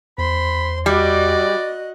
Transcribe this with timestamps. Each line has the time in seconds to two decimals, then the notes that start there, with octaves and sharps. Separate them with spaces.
0.18 E2 C5 B5 C6
0.86 G3 F#4 D5 D#5 F#6